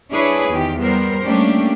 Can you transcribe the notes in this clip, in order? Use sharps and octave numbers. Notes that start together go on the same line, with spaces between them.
D4 E4 G#4 B4 C#5
E2 D#3 G4
G3 B3 A#4 C5
G3 A3 A#3 C#4 D4 G4